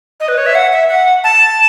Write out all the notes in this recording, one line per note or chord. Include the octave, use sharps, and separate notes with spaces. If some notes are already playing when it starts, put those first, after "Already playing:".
D#5
B4
C#5
E5
F#5
E5
F#5
A5